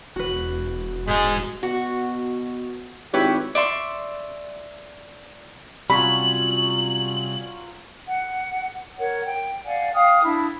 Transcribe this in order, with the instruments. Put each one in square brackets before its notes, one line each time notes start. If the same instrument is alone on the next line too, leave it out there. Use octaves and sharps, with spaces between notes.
[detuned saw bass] E1 [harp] F#4 B4
[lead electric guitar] G#2 G#4 [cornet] G#3
[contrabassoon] B2 [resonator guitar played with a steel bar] F#4
[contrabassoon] G#1 [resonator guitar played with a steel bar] E4 B4 C#5 [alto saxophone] G4
[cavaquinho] D5 E5 C6 C#6
[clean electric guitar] C3 G3 [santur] F#3 C#4 F4 [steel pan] B5 [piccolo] F#7
[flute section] F#5
A#4 C#5 F#5
G5
D5 F5 F#5 G#5
F5 G5 D#6 F6
D4 E4